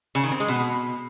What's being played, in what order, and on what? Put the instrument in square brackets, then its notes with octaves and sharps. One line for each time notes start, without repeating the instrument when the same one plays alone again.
[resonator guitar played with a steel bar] C#3
D#3
C4
G#3
B2